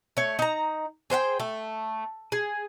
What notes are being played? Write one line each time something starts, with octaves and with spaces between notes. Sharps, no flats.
A3 C#5
D#4 A#5
G#4 C5 F#5 G5
A3
G#4